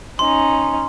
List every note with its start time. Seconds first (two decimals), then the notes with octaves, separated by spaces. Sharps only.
0.19 C#4 D#4 C6